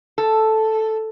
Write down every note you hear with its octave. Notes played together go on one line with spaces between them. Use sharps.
A4